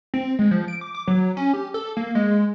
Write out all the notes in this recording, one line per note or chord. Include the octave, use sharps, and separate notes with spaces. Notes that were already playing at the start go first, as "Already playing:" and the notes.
C4
G#3
F3
D7
D6
D6
F#3
C#4
G4
A4
A#3
G#3